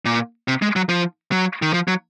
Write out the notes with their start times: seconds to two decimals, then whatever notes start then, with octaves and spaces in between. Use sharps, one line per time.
0.05 A#2
0.48 C3
0.62 G#3
0.76 F#3
0.89 F3
1.32 F#3
1.62 D#3
1.73 F3
1.88 F#3